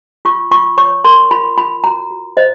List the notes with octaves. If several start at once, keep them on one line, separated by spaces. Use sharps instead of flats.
F4 C#6
F4 C#6
C#5 C#6
A#4 C6
F4 B5
F4 B5
F#4 A#5
F#4
C5 D#5